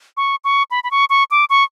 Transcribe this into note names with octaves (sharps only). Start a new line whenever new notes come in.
C#6
C#6
B5
B5
C#6
C#6
D6
C#6